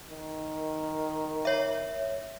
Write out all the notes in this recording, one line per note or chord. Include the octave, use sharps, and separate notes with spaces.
D#3
C#5 E5